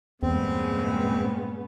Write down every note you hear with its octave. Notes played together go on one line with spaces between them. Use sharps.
E2 G2 A#2 C#3 G#3 B3 C4